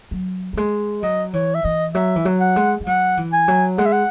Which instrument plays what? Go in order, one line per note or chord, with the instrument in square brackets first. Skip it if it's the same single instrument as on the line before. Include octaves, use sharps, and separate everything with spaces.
[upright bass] F#3
F#3
G#3
[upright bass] F#3 [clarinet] D#5
[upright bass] E3 [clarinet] C#5
[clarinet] E5
[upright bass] E3 [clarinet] D#5
[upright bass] F#3 [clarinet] E5
[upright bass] E3
F#3
[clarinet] F#5
[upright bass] G#3
G#3
[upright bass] F#3 [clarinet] F#5
[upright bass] E3
[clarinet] G#5
[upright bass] F#3
[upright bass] G#3 [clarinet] F#5
[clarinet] E5
F#5